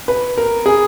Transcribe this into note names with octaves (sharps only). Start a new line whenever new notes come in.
B4
A#4
G#4